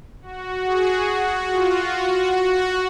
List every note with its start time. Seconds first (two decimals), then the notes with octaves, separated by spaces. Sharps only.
0.22 F#4
0.64 G#4
1.05 F#4
1.46 F4
1.88 F#4